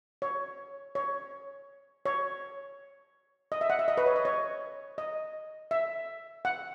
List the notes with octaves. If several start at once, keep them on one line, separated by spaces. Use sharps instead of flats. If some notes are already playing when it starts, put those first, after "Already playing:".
C#5
C#5
C#5
D#5
E5
F#5
E5
D#5
B4
C#5
D#5
C#5
D#5
E5
F#5